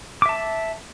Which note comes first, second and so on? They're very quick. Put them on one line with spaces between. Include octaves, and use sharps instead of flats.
D6 E5 A5